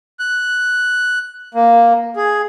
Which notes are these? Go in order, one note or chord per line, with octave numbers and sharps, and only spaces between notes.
F#6
A#3
G#4